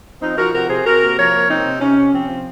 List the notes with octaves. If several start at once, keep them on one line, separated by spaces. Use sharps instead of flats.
F3 C4 D#4
F3 F#4 A#4
C3 F#4 A#4
C3 G#4 C5
C3 F#4 A#4
A#3
F3 A#4 C#5
A#3
C3 C4 D#4
C3
C3 C#4
C3
F3 C4
F3